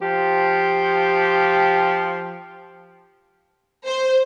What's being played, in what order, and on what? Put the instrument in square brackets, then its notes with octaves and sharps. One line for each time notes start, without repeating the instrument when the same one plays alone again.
[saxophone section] F3 G4
[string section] C5